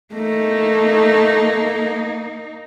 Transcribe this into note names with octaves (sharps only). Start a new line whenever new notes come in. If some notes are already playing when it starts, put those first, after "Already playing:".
A3 A#3 D#4